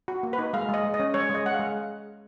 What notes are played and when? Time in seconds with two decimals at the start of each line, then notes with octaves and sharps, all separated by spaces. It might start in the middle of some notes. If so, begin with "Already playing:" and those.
0.08 F#4
0.23 A#3
0.33 B4
0.39 D#4
0.53 G#3 F5
0.69 G#3 D#5
0.84 G#3
0.94 D#5
1.00 C#4
1.14 G#3 C#5
1.29 G#3
1.35 D#5
1.45 G#3 F#5
1.54 F5
1.59 G#3